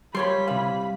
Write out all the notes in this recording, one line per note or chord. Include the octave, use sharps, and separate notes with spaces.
F3 G3 C#5 B5 C6
C3 E3 F5